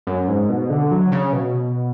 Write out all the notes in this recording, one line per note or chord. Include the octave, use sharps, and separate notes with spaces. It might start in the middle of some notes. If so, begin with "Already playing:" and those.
F#2
G#2
B2
D3
F#3
C#3
B2